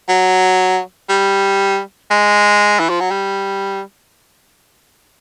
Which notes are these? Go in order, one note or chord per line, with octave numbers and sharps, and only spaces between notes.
F#3
G3
G#3
E3
F3
F#3
G3